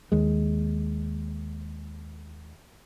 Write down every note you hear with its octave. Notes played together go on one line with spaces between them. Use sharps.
D#2 G#3